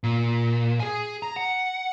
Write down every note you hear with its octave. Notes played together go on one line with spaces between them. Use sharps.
A#2
G#4 G#5
A#5
F#5